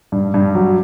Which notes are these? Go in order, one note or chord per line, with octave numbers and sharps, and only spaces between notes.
G2
G2
F#3